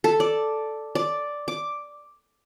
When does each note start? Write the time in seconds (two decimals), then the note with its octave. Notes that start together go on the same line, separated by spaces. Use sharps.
0.04 A4
0.20 D5
0.95 D5
1.48 D6